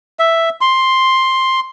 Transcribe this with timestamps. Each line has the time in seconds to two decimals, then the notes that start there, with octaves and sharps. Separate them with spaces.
0.19 E5
0.61 C6